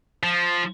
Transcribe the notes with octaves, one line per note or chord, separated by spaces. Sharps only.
F3